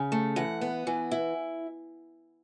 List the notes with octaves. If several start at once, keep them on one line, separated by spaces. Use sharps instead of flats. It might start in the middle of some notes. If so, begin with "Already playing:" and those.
Already playing: C#3
A3
E3 F#5
B3
E3
E4